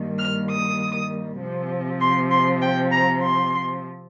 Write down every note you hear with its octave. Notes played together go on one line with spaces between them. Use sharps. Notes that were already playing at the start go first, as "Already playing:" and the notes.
Already playing: G2 D#3 G3 A#3
F6
D#6
C3 F3 C4
C6
C6
G5
A#5
C6